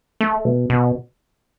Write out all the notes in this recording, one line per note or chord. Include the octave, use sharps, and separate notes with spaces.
A3
B2
B2